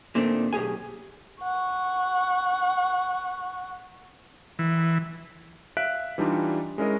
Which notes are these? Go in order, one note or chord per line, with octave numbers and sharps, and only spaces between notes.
A#2 D#3 A3 C4 D4
B1 A2 G4 G#4 G#5
F#5 C#6
E3
E5 F5 F#6 B6 D7
E3 G3 D4 D#4 F4
G#3 C#4 E4 A#4 C#5 D#5